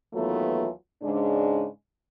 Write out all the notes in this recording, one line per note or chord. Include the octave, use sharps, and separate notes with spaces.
D#2 E3 F#3 A3 B3 F4
G#2 C#3 G#3 D4